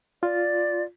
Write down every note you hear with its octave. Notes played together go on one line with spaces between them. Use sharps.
F4 D5